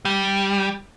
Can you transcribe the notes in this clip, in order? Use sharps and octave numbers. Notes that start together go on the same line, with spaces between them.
G3